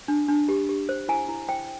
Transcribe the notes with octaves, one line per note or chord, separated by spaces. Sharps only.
D4
D4
G4
G4
C5
E4 G#5
E4
C5 G5